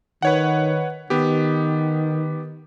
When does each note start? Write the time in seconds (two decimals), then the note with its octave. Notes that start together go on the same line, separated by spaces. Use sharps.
0.22 D#3 B4 C#5 F#5
1.10 D#3 B3 G4